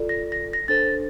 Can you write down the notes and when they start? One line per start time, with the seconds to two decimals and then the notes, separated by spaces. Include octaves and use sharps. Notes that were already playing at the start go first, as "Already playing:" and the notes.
Already playing: F4 A4 D5
0.09 A#6
0.32 A#6
0.53 A#6
0.68 D4 A4 C5 A6